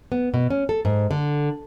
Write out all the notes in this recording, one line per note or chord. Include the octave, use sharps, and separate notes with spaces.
B3
B2
C#4
A4
G#2
D3